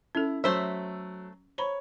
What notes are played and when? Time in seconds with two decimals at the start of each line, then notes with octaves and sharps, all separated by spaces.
0.15 C#4 E4 A4
0.44 F#3 A3 C5 E5
1.58 C5 C#5 A#5 B5